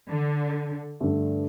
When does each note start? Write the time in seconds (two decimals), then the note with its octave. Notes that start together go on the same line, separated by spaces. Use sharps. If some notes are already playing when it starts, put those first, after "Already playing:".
0.09 D3
1.00 G2 D3 A3